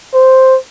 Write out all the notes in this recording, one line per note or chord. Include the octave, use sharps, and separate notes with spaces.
C5